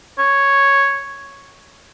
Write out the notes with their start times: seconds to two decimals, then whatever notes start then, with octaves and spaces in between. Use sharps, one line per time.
0.18 C#5